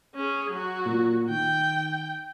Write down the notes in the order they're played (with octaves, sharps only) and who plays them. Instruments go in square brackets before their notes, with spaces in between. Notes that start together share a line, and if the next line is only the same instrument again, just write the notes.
[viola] C#4 G#4
F#3 F#4
[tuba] A#2
[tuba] D#3 [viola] G5